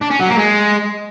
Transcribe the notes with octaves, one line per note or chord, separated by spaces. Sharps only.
D4
C#4
F#3
A#3
G#3